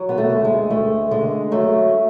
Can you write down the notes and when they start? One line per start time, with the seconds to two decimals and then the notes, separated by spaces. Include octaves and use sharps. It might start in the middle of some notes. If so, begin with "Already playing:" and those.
Already playing: F#3
0.09 B3
0.18 A3
0.30 D2
0.45 G#3
0.70 D2 A3
1.11 D3 G#3
1.51 F#3 A3